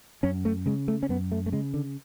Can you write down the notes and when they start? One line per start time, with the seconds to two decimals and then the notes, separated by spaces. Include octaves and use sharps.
0.23 F#2 C#4
0.45 A3
0.66 C#3 G#3
0.88 A3
1.03 C#4
1.09 F#2 B3
1.32 A3
1.46 A3
1.52 C#3 G#3
1.74 D3